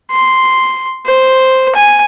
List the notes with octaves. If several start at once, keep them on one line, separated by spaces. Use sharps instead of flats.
C6
C5
G#5